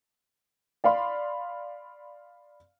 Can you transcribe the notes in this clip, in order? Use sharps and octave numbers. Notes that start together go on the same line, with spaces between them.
D5 F5 B5 C6